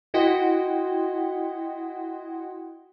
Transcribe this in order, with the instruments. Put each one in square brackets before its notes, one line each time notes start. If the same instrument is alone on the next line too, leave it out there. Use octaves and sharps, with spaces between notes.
[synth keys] E4 F#4 D#5 F#5 G5 C6